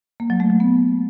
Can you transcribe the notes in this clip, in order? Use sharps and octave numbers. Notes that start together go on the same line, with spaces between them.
A#3
F#3
A3
F#3
B3